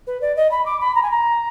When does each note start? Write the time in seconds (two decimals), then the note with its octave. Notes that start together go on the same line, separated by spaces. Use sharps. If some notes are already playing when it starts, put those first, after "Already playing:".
0.06 B4
0.21 D5
0.36 D#5
0.51 B5
0.65 D6
0.80 B5
0.95 A#5
1.03 G#5
1.11 A#5